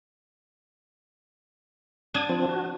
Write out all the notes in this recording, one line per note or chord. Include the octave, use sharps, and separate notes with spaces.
D4 D#6 G#6
F3 C4
F#4